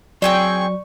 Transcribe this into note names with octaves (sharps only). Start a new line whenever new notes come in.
F#3 C4 G#4 D5 G5 C#6